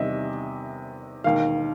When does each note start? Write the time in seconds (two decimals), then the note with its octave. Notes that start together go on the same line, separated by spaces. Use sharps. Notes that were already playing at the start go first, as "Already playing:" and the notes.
Already playing: E2 C3 D#3 G3 D#5 E5
1.24 E1 D#2 D#3 F5